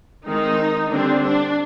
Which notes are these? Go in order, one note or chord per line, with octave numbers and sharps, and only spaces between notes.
D#3 G#3 C4 D#4
D3 G3 C4 D4
D4